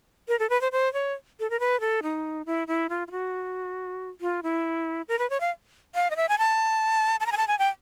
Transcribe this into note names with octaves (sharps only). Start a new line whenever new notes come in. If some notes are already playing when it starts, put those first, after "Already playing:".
A#4
A4
B4
C5
C5
C#5
A4
A#4
B4
A4
D#4
E4
E4
F4
F4
F#4
F4
E4
A#4
B4
C#5
F5
F5
D#5
E5
G#5
A5
A5
A#5
G#5
A5
G#5
G5